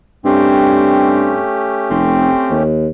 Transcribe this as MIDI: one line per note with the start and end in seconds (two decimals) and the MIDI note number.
0.25 1.39 43
0.25 2.63 57
0.25 1.45 60
0.25 2.63 61
0.25 2.63 67
1.90 2.29 29
1.90 2.58 60
2.51 2.89 39